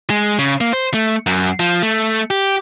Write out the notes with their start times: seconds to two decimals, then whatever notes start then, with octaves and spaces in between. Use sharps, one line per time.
0.10 G#3
0.39 C#3
0.61 A#3
0.73 C5
0.94 A3
1.27 F#2
1.60 F3
1.82 A3
2.30 G4